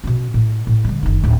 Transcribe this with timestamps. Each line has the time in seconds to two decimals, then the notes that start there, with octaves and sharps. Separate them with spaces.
0.04 B2 C#4
0.34 A2
0.67 A2
0.84 D3 G3
1.03 F#1 D#3
1.23 D1 A1